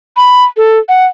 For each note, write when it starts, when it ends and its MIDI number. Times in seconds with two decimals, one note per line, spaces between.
0.17 0.45 83
0.57 0.79 69
0.89 1.06 78